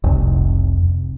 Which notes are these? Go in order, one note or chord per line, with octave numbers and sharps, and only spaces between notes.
F1 C2 C3